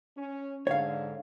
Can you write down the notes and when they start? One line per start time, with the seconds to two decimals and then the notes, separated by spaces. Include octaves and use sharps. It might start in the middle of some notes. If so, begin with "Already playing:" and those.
0.17 C#4
0.67 G#2 D3 C#5 F5